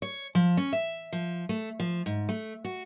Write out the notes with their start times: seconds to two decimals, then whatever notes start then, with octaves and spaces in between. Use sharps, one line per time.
0.02 C#5
0.35 F3
0.57 C#4
0.73 E5
1.13 F3
1.49 A3
1.80 F3
2.06 G#2
2.29 A3
2.65 F#4